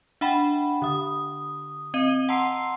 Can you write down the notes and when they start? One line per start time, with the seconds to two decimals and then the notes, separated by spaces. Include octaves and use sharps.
0.21 D4 E5 F#5 G5 B5
0.82 D3 D#6
1.94 C4 D#5 D#7 G7
2.29 F#5 A5 A#5 C6 E6 C7